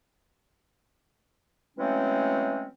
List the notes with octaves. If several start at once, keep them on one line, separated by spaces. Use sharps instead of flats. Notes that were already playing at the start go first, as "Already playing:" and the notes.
E3 F#3 G#3 A3 C4 C#4